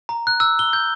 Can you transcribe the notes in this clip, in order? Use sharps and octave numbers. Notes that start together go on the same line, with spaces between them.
A#5
F#6
E6
G7
G6